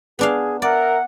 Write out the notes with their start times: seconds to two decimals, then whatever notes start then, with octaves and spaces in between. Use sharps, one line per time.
0.19 B3 D4 G#4 F5
0.62 A#4 D5 E5 F#5